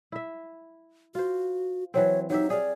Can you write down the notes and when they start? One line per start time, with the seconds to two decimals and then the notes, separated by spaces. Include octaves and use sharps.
0.12 E4 E5
1.15 F4 F#4 C5
1.94 E3 F#3 C4 C#5
2.30 F#3 D#4 G4 E5
2.50 G#4 D5 F5